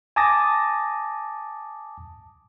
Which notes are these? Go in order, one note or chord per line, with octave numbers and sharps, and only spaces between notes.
G#5 A5 D6 D#6 A6 A#6